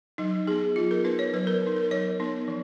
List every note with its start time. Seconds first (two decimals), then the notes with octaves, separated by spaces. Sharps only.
0.18 F#3 D#4
0.47 B3 D#4 G#4
0.76 F#3 F4
0.91 A#4
1.04 B3 D#4 B4
1.19 C#5
1.33 F#3 B4
1.47 A#4
1.62 B3 D#4
1.76 A#4
1.91 F#3 C#5
2.20 B3 D#4
2.48 F3